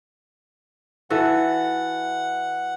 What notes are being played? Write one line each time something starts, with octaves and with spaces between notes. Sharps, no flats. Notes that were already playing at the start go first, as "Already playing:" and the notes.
E3 F#4 A4 F#5